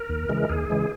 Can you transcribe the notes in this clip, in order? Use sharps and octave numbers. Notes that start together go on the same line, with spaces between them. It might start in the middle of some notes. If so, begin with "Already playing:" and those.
Already playing: A#4
D#2
C#3 E3 G#3
D#2 G#4
C#3 E3 G#3